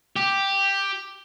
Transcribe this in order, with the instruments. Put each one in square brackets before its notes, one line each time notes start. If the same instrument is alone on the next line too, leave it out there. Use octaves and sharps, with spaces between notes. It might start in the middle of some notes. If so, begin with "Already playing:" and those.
[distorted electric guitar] G4